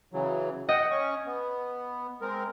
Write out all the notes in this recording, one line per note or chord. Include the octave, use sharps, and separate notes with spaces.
C#3 E3 F#3
D#5 F#5 G5
C#4 C#6
B3
G#3 C4 A#4